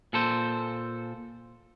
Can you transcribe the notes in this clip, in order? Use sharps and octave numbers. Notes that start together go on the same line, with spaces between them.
A#2 A4 C5